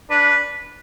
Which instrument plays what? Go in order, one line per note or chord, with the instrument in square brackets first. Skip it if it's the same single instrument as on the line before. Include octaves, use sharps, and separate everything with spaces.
[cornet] D4 [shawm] B4